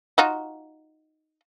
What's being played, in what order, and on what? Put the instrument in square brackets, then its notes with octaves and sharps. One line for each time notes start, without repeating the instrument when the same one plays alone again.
[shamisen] D#4 F4 F#4